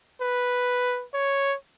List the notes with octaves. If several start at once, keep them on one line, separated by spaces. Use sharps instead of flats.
B4
C#5